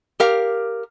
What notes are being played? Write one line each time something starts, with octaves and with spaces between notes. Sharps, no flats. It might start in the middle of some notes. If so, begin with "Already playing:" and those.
G4 A#4 F5